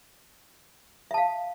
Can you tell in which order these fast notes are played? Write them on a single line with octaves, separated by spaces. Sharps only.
E5 A5 F5